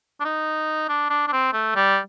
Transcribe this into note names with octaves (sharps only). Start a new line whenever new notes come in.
D4
D#4
D4
D4
D4
C4
A3
G3